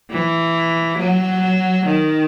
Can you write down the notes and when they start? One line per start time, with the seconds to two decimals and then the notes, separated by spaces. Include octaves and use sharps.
0.11 E3
0.98 F#3
1.86 D#3